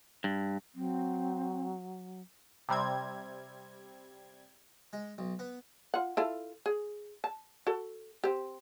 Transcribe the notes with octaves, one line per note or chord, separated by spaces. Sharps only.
G2
F#3 C4
C3 G3 C4 G#6
G#3
B1
B3
F4 F#5
E4 F4 A4
G#4
A5
F#4 A4
C4 G4